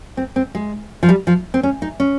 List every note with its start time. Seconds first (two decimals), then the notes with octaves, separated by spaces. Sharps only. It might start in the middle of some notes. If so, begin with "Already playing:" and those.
0.17 C4
0.36 C4
0.55 G#3
1.03 F3
1.09 G3
1.27 F3
1.54 C4
1.63 C#4
1.82 D#4
2.00 C#4